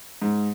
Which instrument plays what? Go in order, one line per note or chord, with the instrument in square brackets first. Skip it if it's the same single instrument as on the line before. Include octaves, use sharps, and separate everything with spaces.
[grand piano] G#2